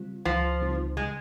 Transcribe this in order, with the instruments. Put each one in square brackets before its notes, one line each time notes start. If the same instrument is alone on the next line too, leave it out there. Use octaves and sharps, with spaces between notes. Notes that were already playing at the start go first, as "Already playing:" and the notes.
Already playing: [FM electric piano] C#3 G3 C4 F4
[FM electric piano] C#2 [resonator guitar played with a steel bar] F3
[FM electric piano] C#3 G3 C4 D#4
[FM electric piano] C#3 [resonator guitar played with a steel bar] G#3